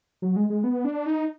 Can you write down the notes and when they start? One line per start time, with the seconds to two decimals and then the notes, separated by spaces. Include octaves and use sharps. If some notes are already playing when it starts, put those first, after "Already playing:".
0.22 F#3
0.36 G#3
0.50 G#3
0.64 B3
0.85 D4
1.06 D#4